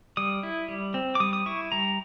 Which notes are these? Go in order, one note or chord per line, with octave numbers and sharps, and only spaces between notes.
G3 D#6
E4
G3
C4
D6
G3 D#6
D#6
E4 C#6
G3 A#5